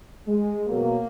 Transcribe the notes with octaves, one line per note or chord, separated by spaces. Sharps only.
G#3
B2 F#3 A#3